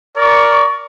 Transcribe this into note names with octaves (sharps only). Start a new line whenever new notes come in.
A#4 D5 C#6